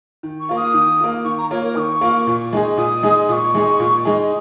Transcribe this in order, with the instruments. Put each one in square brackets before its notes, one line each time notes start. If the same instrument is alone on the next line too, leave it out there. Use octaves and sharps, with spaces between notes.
[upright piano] D#3
[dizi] C#6
[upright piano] A#3 F4
[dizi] D#6
[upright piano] D#3
A#3 F4
[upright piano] D#3 [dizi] C#6
[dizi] A#5
[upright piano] A#3 F4 [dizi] C#5
[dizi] A#4
[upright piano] D#3 [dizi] C#6 D#6
[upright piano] A#3 F4
A#2
G#3 D#4 G#4
[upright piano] A#2 [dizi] D#6
[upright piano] G#3 D#4 G#4
[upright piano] A#2 [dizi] C#6 D#6
[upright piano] G#3 D#4 G#4
A#2
G#3 D#4 G#4